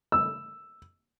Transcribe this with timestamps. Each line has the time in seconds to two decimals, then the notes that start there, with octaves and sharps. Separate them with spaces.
0.12 E6